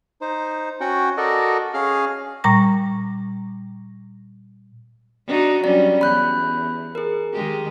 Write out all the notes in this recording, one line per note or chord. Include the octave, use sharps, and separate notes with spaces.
D#4 C5
C#4 F#4 F#5 G5
F#4 A4 A#4 D5 D#5
C#4 G#4 F5 F6
A#2 G3 A#5 C#6 A#6
D4 D#4 F#4
F#3 G3 C#4 D5
E2 B5 F#6 G6
G#4 A#4
D#3 G#3 G4